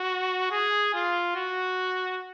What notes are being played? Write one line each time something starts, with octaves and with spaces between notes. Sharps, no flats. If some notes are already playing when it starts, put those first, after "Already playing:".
Already playing: F#4
G#4
F4
F#4